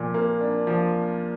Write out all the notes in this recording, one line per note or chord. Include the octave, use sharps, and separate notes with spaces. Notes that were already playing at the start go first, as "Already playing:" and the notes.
Already playing: A#2 F3
A#3
D4
F3